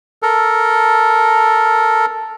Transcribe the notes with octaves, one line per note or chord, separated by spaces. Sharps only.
A4 A#4